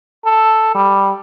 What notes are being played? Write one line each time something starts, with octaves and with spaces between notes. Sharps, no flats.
A4
G3